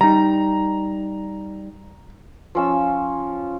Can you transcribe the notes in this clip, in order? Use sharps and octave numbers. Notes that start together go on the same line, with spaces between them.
G3 D#4 A#5
F3 C#4 E6